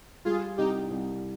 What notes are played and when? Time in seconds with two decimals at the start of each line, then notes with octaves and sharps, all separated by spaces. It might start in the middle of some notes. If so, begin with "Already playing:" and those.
0.25 G3 F4 G#4
0.57 C2 D#4 G4
0.90 C2